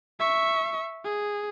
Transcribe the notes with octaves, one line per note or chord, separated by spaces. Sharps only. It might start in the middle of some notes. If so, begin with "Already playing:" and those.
E5 C#6
G#4